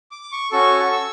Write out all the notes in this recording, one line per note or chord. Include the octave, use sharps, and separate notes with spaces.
D6
C#6
C#4 F#4 A4 C#6
E6